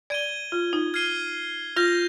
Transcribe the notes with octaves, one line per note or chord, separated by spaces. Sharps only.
D5 G#6 D#7 G7
F4
D#4
F6 G#6 C7 D#7 G7
F4 G6 A#6 F7